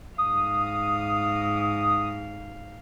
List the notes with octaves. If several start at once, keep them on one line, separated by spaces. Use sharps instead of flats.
G#2 F5 D#6